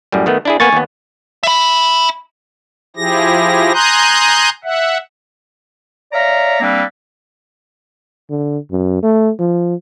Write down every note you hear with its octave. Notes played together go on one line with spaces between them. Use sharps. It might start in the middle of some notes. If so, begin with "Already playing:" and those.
F#2 A2 G3
D#3 A3 B3
D4 E4 G#4
A#3 B3 G#5 C#6 A6
D#2 B3
E5 B5
F3 E4 G4 G#4 A#6
G#5 A#5 C6 D#6 F#6 G6
E5 F#5
C#5 D5 E5 F5 A#5
G3 A#3 C4 D4 A4 B4
D3
F#2
A3
F3